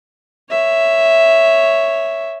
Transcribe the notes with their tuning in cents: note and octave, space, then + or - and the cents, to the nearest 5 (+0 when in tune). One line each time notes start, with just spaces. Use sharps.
C#5 +0 E5 +0